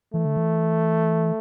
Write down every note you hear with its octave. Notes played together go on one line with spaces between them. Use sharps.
E3 A3
D3
E3